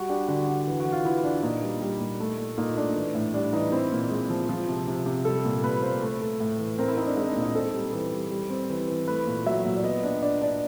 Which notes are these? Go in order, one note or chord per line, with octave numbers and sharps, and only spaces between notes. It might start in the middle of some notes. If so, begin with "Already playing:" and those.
Already playing: G3 F#4
D4 G4
D3 F#4
D3
E3
F#4
E3
F4
E3 E4
D4
A#2 D#4
G3
G3
A#2
A3
A3
A#2 D#4
A3 D4
E3
A2
G3 D4
E3 D#4
C4 E4
A#2
G#3
F3
F3
C3
C3
C3
G3 A4
A#2
A#2 B4
A#3 C5
A3
A3
A2
E3
C4 A#4
E4
C4 D#4
D4
G#3 D#4
D4
A#2
D#4
C4 A4
G3
E3
G3
G3
C4
E3
E3
A3 B4
A#2
F#3 E5
A#2
D5
B3 D#5
D4
D4 D5
D4 D5